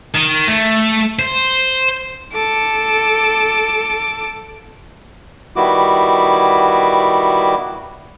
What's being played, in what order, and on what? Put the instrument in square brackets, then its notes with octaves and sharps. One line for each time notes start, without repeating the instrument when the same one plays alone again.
[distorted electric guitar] D#3
A3
C5
[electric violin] A4 D6
[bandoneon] D#3 G3 B3 E4 F#4 D6